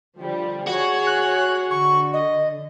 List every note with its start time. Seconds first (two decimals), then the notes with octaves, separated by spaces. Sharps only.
0.19 D3 F3 G3
0.68 F#4 G#4 C#5
1.06 F#6
1.70 D3 C#6
2.13 D#5